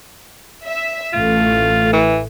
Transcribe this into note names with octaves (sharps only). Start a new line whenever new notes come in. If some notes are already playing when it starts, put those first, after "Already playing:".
E5
A1 A3 F4
E3